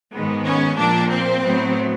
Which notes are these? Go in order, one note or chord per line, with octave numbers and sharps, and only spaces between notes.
G#2 D#3 G#3 B3
C#4
A#2 F3 A#3 D4
C4
A2 F#3 B3